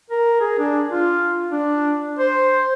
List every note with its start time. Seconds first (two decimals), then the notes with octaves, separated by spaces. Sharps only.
0.10 A#4
0.41 G#4
0.59 D4
0.92 F4
1.51 D4
2.19 C5